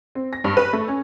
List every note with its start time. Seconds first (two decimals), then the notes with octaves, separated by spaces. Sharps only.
0.15 C4
0.33 A#6
0.44 G2
0.57 B4
0.73 A3
0.88 C#4